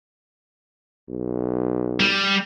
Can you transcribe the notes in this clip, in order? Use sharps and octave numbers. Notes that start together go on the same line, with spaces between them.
B1
G3